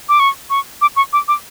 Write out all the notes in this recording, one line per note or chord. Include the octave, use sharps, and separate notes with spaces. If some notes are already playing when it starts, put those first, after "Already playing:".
D6
C#6
C#6
D6
C#6
D6
D6